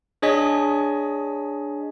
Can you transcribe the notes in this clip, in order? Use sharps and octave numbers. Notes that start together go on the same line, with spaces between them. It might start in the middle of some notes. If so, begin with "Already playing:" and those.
D4 G#4 C#5 D#5 G#5 B6